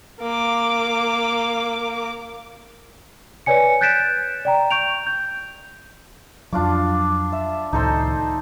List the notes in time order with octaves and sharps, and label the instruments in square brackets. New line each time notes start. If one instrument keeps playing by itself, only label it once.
[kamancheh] A#3 D6
[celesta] B4 C#5 D5 G#5 C#7
F#6 G6 A6 B6 D7 E7
D5 G5 A#5
C#6 G6 D7 F7
G6
[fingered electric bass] F2 F#3 [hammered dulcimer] D4 F4 D6
[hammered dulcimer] E5
[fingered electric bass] C#2 A2 D#3 [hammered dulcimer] D#4 A4 C5